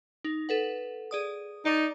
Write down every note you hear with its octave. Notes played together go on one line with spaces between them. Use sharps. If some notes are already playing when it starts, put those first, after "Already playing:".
D#4
A4 B4 F#5
G#4 D5 D#6
D#4 D5 D6 A6